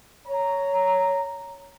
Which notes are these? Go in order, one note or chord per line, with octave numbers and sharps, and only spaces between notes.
C#5 A#5